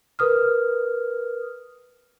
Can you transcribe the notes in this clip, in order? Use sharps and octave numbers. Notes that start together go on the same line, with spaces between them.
A#4 B4 D#6 F6